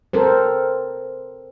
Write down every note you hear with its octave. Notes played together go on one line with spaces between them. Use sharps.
C4 A4 A#4 C5